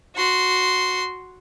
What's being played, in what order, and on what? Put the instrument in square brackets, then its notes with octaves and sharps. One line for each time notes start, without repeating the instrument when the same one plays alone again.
[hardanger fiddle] F#4 C6